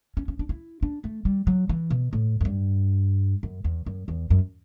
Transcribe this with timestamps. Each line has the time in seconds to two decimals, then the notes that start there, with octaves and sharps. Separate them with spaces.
0.17 C#4
0.28 C#4
0.39 D4
0.49 E4
0.83 D4
1.04 A3
1.25 G3
1.47 F#3
1.69 E3
1.90 B2
2.13 A2
2.41 F#2
2.45 G2
3.43 F#2
3.64 E2
3.86 F#2
4.08 E2
4.30 F#2